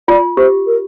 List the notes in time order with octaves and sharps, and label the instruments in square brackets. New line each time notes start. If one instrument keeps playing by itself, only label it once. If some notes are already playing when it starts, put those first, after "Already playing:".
[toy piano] F4 [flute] D5
[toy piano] G4 [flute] C5
[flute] A#4